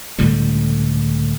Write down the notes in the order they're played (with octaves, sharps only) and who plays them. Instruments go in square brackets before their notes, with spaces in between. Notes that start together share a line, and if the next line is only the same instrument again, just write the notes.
[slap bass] C#2 A2 D3 G3